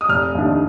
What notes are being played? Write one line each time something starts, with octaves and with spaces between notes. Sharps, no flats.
D#6
F1 F6
D#2 D#3 A3 D4